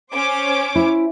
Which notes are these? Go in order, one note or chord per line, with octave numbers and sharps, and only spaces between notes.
C#4 C5 D6
E4